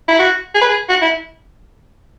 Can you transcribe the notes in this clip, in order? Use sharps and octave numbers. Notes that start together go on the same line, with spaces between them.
E4
F#4
G#4
B4
G#4
F#4
E4